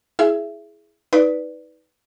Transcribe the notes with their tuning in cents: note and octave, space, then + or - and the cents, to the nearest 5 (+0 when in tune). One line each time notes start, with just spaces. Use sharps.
E4 +0 G#4 +10 E5 +20
D#4 +30 B4 +0 D5 -5